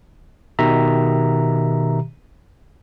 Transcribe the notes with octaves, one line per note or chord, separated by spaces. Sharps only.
B2 D#3 G4 E5 A#5